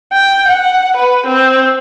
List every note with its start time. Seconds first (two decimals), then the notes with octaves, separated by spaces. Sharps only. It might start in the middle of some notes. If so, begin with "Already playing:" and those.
0.13 G5
0.48 F#5
0.96 B4
1.26 C4